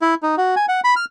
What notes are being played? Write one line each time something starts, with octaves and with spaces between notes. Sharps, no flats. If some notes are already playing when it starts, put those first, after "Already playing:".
E4
D#4
F#4
G#5
F#5
B5
F6